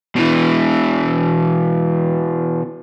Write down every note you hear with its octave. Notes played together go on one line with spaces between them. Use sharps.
B2 E3